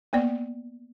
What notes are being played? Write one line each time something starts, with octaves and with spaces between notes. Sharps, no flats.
A#3 B3 D5